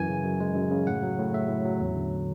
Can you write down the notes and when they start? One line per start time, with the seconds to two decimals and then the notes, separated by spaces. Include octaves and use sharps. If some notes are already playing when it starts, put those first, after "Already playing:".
Already playing: F#2 E3 G#5
0.09 C#3
0.24 F#2
0.40 G#3
0.56 F#2
0.71 C#3
0.87 A2 F#5
1.03 F#3
1.18 A2
1.33 A3 E5
1.49 A2
1.65 F#3
1.81 E2
1.96 D3